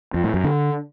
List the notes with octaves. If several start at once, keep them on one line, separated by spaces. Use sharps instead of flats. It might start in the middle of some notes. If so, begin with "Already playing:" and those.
F2
A2
F#2
D3